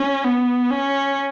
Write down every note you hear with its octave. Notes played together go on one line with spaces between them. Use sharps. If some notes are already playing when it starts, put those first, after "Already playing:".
Already playing: C#4
B3
C#4